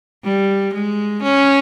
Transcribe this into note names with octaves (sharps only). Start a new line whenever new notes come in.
G3
G#3
C#4